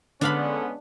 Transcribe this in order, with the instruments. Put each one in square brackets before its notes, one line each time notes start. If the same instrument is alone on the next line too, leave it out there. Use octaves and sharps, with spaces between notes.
[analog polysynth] D3 [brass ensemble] G#3 B3 C#4 [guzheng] D4 F5 B5